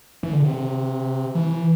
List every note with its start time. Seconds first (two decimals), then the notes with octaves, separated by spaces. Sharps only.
0.23 E3
0.33 D3
0.42 C3
1.35 E3